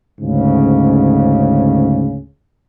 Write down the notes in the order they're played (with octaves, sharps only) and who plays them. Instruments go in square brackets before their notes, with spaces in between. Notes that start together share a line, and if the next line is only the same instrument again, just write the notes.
[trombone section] D2 G#2 C#3